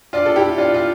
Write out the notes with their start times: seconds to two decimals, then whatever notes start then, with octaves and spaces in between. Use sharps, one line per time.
0.13 D4 F4
0.26 A4
0.36 E4 G4
0.58 D4 F4
0.74 F4